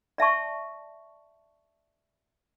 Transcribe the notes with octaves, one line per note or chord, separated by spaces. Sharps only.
D5 E5 A5 C#6